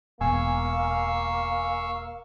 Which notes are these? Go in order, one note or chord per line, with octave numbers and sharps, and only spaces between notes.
E1 B2 A#3 F5 G#5 C#6 E6